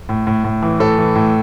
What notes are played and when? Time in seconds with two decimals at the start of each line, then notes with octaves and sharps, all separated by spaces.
0.09 A2
0.27 A2
0.44 A2
0.62 E3
0.80 A2 A4
0.98 E3
1.16 A2